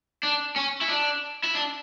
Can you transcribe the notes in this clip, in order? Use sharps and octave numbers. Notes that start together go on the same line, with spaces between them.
D4
C#4
E4
D4
E4
D4